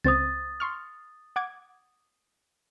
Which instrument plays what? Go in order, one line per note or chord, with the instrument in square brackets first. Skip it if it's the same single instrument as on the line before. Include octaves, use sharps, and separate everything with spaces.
[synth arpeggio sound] C#2 C4 C5 [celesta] D#6 A6
[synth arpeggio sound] C6 C#6 F6
F#5 D6 G#6